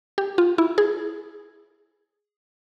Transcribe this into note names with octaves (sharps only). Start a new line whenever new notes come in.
G4
F4
E4
G#4